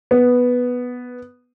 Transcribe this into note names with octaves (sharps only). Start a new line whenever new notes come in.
B3